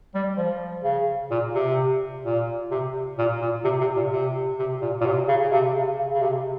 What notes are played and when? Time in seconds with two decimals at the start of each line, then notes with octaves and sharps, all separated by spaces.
0.14 G3
0.37 F3
0.84 C#3
1.30 A#2
1.54 C3
2.25 A#2
2.71 C3
3.18 A#2
3.41 A#2
3.64 C3
3.81 C3
3.96 A#2
4.12 C3
4.59 C3
4.81 A#2
5.00 A#2
5.05 C3
5.28 C#3
5.41 C#3
5.52 C3
5.75 C#3
5.98 C#3
6.13 C#3
6.22 C3